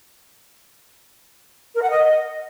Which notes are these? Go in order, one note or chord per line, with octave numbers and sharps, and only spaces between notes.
A#4
F#5
D#5